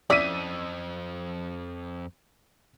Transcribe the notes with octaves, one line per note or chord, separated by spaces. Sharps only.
F2 C#4 E4 D5 E6 B6 D#7